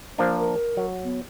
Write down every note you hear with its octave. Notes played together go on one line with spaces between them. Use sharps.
F3 A#3 D4 C5
A#4
F#3
B3